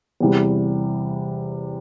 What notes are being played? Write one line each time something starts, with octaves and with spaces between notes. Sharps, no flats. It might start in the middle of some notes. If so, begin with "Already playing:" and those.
E2 C3 E3 G3